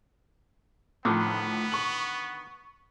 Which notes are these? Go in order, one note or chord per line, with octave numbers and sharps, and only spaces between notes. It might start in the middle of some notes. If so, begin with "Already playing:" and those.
A2 D3 D#3 F3 B3
C#6 F#7